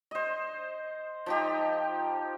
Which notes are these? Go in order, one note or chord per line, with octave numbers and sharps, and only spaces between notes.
C5 D#5
F3 D#4 G4